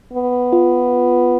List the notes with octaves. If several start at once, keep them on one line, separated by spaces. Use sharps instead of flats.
B3
F4